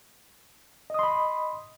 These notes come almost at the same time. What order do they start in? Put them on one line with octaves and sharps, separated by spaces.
D#5 D#6 C6 B5